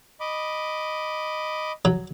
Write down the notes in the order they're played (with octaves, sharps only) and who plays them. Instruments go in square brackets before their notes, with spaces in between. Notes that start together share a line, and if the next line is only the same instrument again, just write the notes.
[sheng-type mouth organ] D#5 B5 D6
[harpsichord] F#3